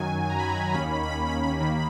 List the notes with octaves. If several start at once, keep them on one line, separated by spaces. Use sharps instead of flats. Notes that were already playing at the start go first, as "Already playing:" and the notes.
Already playing: F#2 D#3 F#3 G#5
A#5
B5
A#5
D#2 D#3 A#3 C#4 B5
B5
B5
D#2 D#3 A#3